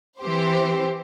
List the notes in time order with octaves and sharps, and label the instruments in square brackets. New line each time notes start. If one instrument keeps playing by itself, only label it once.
[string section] E3 C4 G4 C5